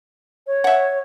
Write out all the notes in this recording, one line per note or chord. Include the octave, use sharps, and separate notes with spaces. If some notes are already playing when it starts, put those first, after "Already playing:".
C#5
E5 F#5